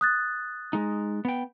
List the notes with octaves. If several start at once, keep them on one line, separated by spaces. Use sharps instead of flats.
D#6 F#6 A6
G#3 D#4
B3 G5